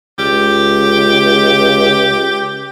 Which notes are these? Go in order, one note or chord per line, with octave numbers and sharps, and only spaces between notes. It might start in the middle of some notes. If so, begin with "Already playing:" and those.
C#2 G4